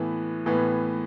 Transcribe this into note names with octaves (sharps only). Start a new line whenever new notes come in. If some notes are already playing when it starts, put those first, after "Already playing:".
Already playing: A2 E3 B3 B4
A2 E3 B3